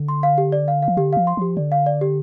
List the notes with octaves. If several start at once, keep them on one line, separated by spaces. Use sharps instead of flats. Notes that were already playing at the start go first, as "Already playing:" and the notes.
Already playing: D3
C6
F5
G4
D5
F5
F5
F3
D3 G4
F3 F5
C6
F3 G4
D3 D5
F5
D5
G4